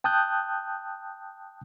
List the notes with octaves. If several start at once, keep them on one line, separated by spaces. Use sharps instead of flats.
G5 A5 D#6 F#6 G6